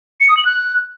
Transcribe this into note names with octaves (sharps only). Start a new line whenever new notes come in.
C#7
D#6
F#7
F#6